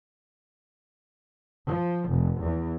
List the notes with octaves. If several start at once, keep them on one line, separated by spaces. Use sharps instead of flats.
F3
F1
E2